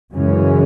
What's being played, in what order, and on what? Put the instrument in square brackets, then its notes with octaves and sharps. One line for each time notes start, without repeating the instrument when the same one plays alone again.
[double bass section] F#2 C#3 E3 G#3 C#4